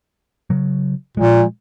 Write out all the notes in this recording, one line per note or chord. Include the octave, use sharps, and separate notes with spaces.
C#3 F#3
A#2 F3 G#3